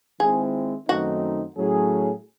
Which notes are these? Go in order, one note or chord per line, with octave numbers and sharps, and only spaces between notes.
D#3 G#3 C4 E4 G#4
F#2 D#3 A3 C4 D#4 F#4
A2 F#3 C#4 G#4